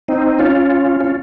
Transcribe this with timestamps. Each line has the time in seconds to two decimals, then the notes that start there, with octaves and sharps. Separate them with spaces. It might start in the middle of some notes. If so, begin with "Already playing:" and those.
0.08 C4 D#4
0.39 C#4 F4
1.00 C#4 F4